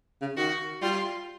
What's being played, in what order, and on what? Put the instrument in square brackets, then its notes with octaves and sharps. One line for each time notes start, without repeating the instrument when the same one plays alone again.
[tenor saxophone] C#3
[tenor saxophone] D#3 [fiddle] F#4
[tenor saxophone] G3 [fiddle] F4